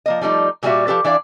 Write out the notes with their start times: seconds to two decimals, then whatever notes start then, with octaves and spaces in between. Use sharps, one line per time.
0.06 F3 A#3 D#5
0.21 F3 G3 A3 D#4
0.63 A#2 F#3 G3 F4 F#4 E5
0.87 F3 G4 A4 B4
1.04 E3 D4 D5 F5